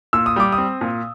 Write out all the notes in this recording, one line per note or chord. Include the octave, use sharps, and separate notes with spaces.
A#2 E6
D#6
G3 D6
D#6
C4
A#2